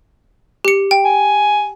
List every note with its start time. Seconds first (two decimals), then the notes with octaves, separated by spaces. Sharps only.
0.65 G4 C#7
0.91 G5
1.05 G#5